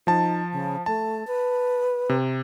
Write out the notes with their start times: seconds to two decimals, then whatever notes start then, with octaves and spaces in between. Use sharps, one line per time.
0.07 F3 D#4 A5
0.52 C#3
0.86 A3 A5
1.27 B4
2.09 C3